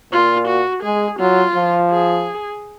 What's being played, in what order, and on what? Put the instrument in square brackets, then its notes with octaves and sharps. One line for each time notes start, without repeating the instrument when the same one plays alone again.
[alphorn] A#2 [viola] F4
[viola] F#4
[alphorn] G#3 [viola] G#4
[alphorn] F#3 [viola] F4
[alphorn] F3
[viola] G#4